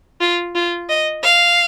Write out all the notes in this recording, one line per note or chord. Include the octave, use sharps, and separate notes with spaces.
F4
F4
D#5
F5